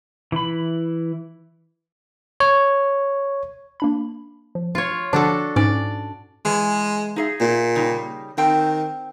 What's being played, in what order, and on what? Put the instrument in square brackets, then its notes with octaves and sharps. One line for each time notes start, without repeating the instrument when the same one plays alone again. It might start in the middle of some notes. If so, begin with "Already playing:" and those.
[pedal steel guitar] E3 B5
[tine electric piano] C#5
[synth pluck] A#3 D4 B5
F3
[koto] F4 C#5
[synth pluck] D3 F3 A5 [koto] D4 F#4 A4
[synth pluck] G#2 C#4 [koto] D5
[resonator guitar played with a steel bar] E3 [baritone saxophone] G#3
[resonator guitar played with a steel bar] D#4 G#4 E5
[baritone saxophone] A#2
[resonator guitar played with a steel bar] C#3 G3 D#4
[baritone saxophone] D#3 [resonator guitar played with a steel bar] C4 G5